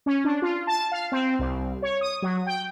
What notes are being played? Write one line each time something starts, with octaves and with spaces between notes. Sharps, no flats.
C#4
D4
F4
A5
F5
C4
C2
C#5
D#6
F#3
G5